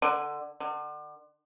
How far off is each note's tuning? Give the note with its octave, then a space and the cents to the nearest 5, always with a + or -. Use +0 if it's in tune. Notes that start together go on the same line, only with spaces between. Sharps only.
D3 +15
D3 +35